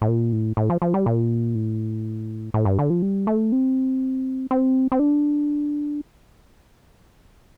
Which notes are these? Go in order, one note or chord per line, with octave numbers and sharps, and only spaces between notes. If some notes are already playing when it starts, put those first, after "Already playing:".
A2
A#2
A2
A2
F3
F3
G3
A#2
A2
A2
G2
D3
F3
G3
A3
C4
C4
C4
D4